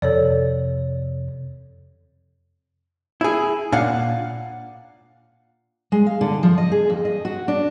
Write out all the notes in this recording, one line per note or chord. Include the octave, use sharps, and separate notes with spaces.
F2 C3 A4 C#5 D5
E4 G#4
A#2 D4 F5 F#5
G#3
F5
D3
F3
D#5
G#4
F2
D#5
F#4
D4